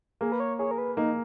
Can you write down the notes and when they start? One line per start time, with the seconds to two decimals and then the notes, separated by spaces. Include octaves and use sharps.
0.21 A#3 G#4
0.32 B4
0.40 C#5
0.59 G#4 C#5
0.71 A#4
0.78 B4
0.97 A#3 D#4